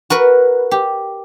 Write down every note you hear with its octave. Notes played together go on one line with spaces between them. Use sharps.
F#4 A#4 B4
G4